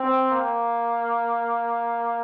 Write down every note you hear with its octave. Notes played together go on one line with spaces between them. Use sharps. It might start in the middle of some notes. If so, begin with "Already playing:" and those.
Already playing: C4
A#3